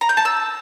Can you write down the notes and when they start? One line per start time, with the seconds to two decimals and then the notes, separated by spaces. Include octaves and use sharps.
0.01 A#5
0.09 G6
0.17 A5
0.25 E6